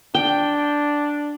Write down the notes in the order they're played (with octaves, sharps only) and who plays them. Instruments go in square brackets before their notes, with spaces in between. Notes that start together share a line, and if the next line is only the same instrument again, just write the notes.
[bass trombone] D4 [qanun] G5